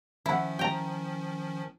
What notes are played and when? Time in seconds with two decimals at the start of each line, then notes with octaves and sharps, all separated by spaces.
0.26 D#3 F3 C#4 E4 F#5
0.59 G5 A#5